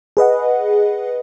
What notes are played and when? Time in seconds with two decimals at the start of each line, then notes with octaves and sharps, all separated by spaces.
0.17 G#4 B4 D#5 F#5